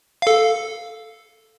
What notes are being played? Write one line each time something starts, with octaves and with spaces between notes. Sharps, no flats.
A4 F5